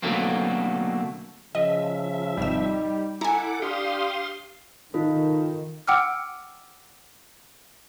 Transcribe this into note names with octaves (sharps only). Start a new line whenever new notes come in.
B2 D3 F#3 A3 A#3 C4
C#3 F3 D#5 E5
G#1 C3 G3 D#4 E6
E4 A4 F#5 G#5 A#5 D6
D4 G4 F5 C6 D#6
D#3 D#4 F4 A4
F#5 G5 D6 E6 F6